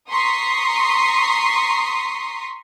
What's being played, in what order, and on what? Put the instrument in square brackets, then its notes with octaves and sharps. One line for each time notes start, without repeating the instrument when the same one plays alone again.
[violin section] A#5 C6 C#6 D#6 B6 C7